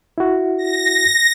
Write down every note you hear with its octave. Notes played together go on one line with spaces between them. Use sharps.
E4 F#4
A#6